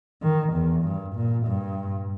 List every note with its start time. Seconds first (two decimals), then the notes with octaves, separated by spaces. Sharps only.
0.22 D#3
0.54 E2
0.85 G2
1.16 A#2
1.47 G2